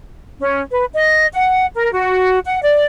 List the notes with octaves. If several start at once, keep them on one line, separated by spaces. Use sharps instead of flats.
C#4
B4
D#5
F#5
A#4
F#4
F#5
D5